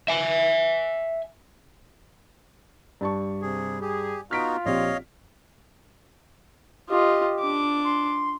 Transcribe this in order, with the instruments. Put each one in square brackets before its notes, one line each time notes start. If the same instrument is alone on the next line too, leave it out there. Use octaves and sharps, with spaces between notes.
[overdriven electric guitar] E5 G#5
[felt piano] G2 A5 C#6
[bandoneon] C3 G#4
[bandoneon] G4 [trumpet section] G#4
[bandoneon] B3 D#4 F#4 [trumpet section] F4 [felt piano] F6 B6 D7
[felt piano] A#1 C4 G4 [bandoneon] C#5 D#5 F5
[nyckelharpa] F4 D#5 [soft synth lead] G4
[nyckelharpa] D4 D6
[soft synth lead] C6